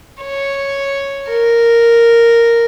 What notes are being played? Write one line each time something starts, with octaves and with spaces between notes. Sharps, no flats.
C#5
A#4